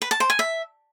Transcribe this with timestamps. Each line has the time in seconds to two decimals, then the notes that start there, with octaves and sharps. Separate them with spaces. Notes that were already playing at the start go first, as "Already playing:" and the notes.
0.02 B4
0.11 A5
0.20 C5
0.30 G#5
0.39 E5